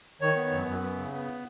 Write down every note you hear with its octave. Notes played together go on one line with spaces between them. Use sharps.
D#3 C#5
B3
F#2
F#2
B3
C#3
B3